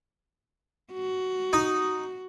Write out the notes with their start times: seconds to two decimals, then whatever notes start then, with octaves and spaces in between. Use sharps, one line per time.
0.92 F#4
1.53 D#4